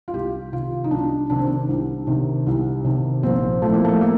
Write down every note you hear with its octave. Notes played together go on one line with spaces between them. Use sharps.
F4
C2 G4
C3 D#3 F4
D#4
C2 D4
C3 D#3 D4
C4
D4
C2
C3 D#3
C2
C3 D#3
A#1 C4
A2 F3 A3
A#3
A3
A#3